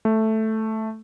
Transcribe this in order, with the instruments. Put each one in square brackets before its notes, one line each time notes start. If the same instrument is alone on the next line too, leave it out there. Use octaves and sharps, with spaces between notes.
[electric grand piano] A3